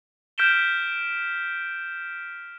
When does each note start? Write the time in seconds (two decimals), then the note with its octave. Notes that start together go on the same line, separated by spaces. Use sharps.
0.38 F6 G6 B6 D7 E7 G7